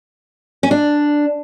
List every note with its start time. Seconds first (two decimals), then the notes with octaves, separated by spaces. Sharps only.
0.63 C#4
0.71 D4